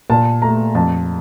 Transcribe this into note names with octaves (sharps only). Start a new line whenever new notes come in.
A#2 A5
A3 A#5
F2 A5